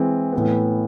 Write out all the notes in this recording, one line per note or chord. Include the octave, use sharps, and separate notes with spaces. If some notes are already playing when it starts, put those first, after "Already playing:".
Already playing: E3 G#3 C4
A2 E3 B3